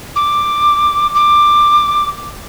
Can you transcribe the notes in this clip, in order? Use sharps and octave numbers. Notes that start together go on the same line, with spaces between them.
D6
D6